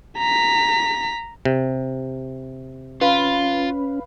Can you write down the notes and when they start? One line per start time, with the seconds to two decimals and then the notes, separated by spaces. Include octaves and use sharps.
0.18 A#5 B6
1.45 C3
3.01 C#4 F4 B4 F5 B5